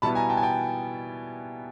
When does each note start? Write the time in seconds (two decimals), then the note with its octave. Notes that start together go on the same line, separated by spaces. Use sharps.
0.02 B2 G3 B3 E4 A5 B5
0.15 G#5 A#5
0.29 G5 A5
0.37 G#5
0.42 G5 A5